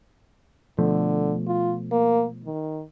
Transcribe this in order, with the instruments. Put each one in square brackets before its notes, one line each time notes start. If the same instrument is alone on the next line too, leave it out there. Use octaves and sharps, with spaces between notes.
[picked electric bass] B2 F3 A3 [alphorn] D3
[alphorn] F4
A#3
D#3